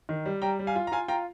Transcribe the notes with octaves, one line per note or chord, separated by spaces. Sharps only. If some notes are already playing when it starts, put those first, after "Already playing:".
D#3
G3
G3 G5 A#5
G3
F5 G#5
F4
A#5
F4 F5 G#5
F4 G5 A#5